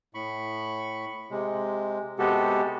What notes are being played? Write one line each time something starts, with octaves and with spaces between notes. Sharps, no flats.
A2 B5 C#6
C3 G#3
C3 G#3 B3 F#4 G4 A4